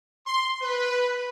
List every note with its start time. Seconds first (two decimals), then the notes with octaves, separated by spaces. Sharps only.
0.27 C6
0.62 B4